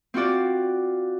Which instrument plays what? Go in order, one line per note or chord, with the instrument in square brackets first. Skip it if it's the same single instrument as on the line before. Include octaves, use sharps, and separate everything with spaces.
[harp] C4 F4 F#4 D5